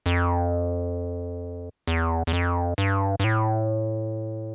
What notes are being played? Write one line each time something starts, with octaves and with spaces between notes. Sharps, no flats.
F2
E2
E2
F2
G2
G2
A2